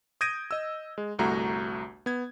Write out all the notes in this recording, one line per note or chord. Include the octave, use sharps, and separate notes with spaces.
D#6 G6 G#6 A#6 D7 D#7
D#5 E6
G#3
G1 C2 A3 F#4 A#5
B3 G#6